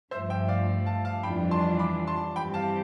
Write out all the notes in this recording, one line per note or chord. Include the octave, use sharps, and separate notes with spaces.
G2 F3 A3 C5 E5
E5 G5
D5 F5
F5 A5
F5 A5
F2 E3 G3 D4 F4 G5 B5
A5 C6
B5 D6
A5 C6
G2 E3 G3 C4 G4 G5 B5
F5 A5